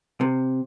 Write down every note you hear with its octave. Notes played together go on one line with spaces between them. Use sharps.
C3